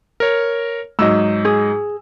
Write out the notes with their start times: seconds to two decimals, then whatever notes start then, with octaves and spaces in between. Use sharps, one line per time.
0.20 A#4 C#5
0.99 G#2 F#3 D#5 E6
1.45 G#4